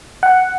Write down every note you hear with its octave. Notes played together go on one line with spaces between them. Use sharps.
F#5